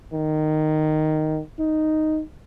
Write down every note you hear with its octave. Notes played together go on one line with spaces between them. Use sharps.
D#3
D#4